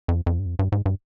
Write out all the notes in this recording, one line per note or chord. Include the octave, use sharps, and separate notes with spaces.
F2
F2
G2
F2
G2
G#2
G2